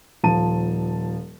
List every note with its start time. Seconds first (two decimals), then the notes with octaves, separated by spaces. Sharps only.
0.24 D#1 F3 A5 D#7